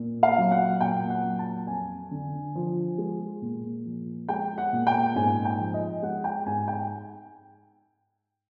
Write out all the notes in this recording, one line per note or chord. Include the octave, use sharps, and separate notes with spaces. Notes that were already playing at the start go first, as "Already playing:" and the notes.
Already playing: A#2
F5
F#3
F#5
A#2 G5
F#5
F#3
A5
F2 G#5
D3
F3
G#3
A#2
F3
G#3 G5
F#5
A#2
G5
G#2 G#5
G5
F3
D#5
G#3 F#5
G5
G#2 G#5
G5